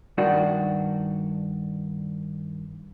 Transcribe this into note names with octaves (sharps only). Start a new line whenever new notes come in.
G2 D#3 D4 F#4